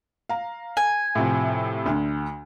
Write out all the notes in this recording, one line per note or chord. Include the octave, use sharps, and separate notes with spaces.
F5 A#5
G#5
A2 C3 F3
D2 D3